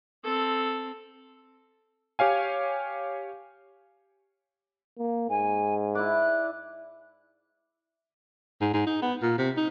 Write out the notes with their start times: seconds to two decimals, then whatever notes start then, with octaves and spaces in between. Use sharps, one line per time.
0.24 C4 A4
2.19 G4 C#5 F5 G#5
4.98 A#3
5.30 G#2 G#5
5.95 E4 D5 F#6
8.61 G#2
8.73 G#2
8.86 D#4
9.02 B3
9.22 A#2
9.38 C3
9.57 D#4